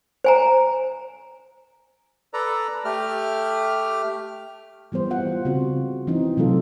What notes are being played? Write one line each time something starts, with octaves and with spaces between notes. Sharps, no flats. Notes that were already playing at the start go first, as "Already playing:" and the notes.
C5 G#5 A#5
A4 B4 D5 A#5
A3 G4 F6
E3 G3 B3 C5
F4 F#5
C#3 C4 F4 F#4
E3 C4 C#4 D#4
C3 F#3 A3 F4 A4